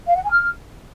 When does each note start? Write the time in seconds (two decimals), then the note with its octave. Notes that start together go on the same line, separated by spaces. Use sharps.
0.07 F5
0.15 F#5
0.23 G#5
0.31 F6